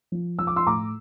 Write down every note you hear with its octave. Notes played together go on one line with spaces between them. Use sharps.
F3
F3 E6
D6
C6 E6
A2 A#5 D6